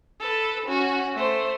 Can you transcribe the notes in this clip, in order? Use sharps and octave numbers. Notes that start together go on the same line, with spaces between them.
A4 B4
C#4 F#4
A3 C5